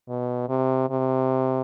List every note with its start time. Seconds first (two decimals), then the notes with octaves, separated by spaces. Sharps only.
0.09 B2
0.49 C3
0.90 C3